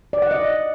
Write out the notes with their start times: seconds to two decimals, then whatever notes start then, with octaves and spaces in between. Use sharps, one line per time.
0.13 D5
0.22 F#5
0.31 D#5